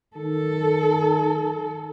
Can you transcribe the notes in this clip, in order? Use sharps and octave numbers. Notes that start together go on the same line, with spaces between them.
D#3 A4